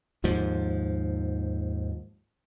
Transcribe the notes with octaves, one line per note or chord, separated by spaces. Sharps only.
D#2 G#2 F3